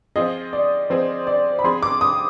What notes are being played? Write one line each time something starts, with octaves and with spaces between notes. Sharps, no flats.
F3 C4 F4 G#4 D#5
D5
F3 C4 F4 G#4 C5
D5
B5
F3 C4 F4 G#4 C6
D6
D#6